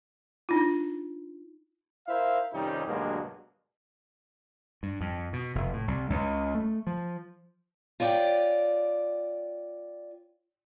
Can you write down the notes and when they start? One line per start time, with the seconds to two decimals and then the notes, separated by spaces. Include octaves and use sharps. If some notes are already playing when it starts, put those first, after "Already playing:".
0.49 D4 D#4 F4
2.08 E4 A#4 C5 E5 F5
2.53 F2 C3 D#3 G3 C#4 D#4
2.87 D2 G2 B2 F#3 G#3 A#3
4.83 G2
5.01 F2
5.33 B2
5.55 F1
5.73 A2
5.88 C2
6.10 C#2
6.54 A3
6.87 F3
8.00 F4 C#5 D5 F5 G5